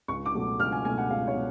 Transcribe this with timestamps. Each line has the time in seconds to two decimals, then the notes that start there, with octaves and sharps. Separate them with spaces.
0.08 C#2 C#6
0.26 D6
0.34 B2 F#3 A3
0.60 C#2 F6
0.72 G#5
0.85 B2 F#3 A3 G#5
0.98 F#5
1.10 C#2 F5
1.28 C#5
1.35 B2